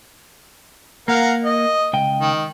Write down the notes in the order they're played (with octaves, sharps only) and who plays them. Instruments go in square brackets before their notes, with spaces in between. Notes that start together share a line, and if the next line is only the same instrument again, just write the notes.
[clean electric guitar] A#3 [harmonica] A#4 F5 F#5
[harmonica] D#5
[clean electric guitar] C#2 D#5 G5
[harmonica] D#3